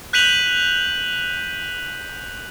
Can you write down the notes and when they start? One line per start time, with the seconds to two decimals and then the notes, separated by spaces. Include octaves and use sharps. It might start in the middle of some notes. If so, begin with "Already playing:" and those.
0.13 F#6 G6 B6 D#7 F7 F#7